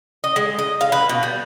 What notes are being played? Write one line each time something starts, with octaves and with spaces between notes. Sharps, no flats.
D#5
G#3
D#5
F5
B4
B2
G3